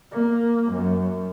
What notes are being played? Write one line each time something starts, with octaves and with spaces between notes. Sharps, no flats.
A#3
F#2